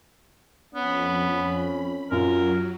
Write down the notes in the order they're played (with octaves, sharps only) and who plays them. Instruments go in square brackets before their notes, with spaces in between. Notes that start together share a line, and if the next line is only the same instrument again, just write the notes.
[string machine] F2 B5 [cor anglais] B3 [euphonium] C#4
[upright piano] F#2 F4 [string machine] F#3 [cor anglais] A#4